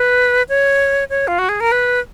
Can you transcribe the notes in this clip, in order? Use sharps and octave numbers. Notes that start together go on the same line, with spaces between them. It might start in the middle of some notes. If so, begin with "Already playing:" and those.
Already playing: B4
C#5
C#5
F4
F#4
G#4
A#4
B4